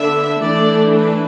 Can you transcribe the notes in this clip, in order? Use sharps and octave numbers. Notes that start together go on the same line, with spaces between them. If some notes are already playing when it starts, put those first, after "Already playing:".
Already playing: D3 B3 D4 E5
E3 A3 D4 D5
B4